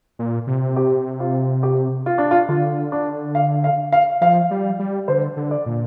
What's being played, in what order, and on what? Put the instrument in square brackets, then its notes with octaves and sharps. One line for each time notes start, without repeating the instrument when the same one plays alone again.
[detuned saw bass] A#2
C3
[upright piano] G4
F4
G4
F4
D4
F4
[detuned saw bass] D3 [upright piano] F4
[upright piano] D4
F5
F5
F5
[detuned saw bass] F3 [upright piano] F5
[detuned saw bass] G3
G3
[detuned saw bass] D3 [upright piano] C5
[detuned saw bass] D3
[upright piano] D5
[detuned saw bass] A#2